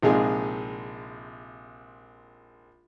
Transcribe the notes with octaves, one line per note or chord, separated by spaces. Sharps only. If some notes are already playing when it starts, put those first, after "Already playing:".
A#1 C3 G#3 D#4 F4 G#4